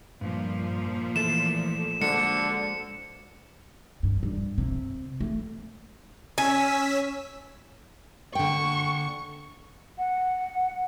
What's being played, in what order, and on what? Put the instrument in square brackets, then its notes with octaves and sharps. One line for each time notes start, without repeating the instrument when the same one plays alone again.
[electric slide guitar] G2 [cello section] A#2 F3
[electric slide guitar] E3 A3 A4 [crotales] E7
[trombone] D3 [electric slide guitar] G#3 F#4 C5 [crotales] C#7
[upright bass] G2
G2
C3
A3
[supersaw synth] C#4 E6 B6 [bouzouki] G#5
[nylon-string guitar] D3 G5 [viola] C#6
[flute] F#5